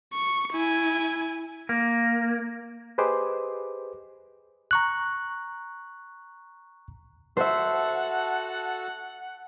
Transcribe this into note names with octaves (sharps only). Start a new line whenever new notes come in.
C#6
E4 G#5
A#3
G4 G#4 B4 C5 D#5 D6
A#5 C#6 F#6
F#4 A4 C5 E5 F#5 A5